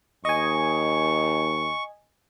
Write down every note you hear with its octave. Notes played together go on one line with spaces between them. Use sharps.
D#2 D#5 G#5 C#6